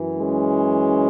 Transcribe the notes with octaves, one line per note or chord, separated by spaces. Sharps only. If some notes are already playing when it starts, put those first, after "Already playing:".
Already playing: F#2 E3
G#3 C#4